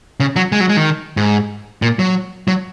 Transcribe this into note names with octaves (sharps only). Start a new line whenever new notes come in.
C#3
F#3
G#3
F#3
G#3
D#3
G#2
A#2
F#3
F#3